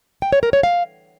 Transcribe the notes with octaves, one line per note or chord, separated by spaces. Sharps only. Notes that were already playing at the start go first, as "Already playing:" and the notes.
G5
C#5
A#4
C#5
F5